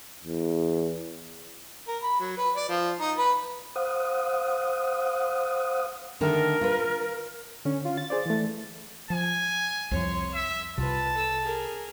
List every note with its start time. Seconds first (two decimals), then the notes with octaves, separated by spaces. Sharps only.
0.23 E2
1.88 A#4
2.03 B5
2.20 F#3
2.37 B4
2.56 D5
2.69 F3
3.00 D#4
3.18 B4
3.76 C5 F5 F#5 D#6
6.21 D3 D#3 A3 A#4
6.61 F4 B4
7.65 D3 C#4
7.85 F4
7.97 A6
8.10 G#4 C5 D5
8.26 E3 A3
9.10 F3 G#5
9.91 C2 F2 F3 C#5 C6
10.34 E5 E6
10.78 C2 C3 F4 B4 A5
11.14 A4 E6
11.43 G#4 A#4